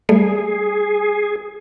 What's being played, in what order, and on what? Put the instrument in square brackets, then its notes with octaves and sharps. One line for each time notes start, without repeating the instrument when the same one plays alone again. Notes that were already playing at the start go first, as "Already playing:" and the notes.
[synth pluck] G3 [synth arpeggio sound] A3 [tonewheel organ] G#4